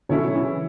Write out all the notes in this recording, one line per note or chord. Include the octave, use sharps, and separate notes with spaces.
B2 D3 F#3 C#4 E4 A4 C#5
C#3 E3